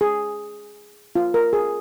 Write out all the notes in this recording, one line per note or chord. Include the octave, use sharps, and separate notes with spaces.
G#4
F4
A#4
G#4